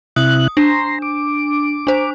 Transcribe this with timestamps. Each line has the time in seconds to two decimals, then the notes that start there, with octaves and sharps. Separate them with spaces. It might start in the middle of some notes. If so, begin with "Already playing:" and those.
0.16 C3 E4 D#6 F#6
0.57 D4 A#5 C6
1.02 D6
1.87 D4 C5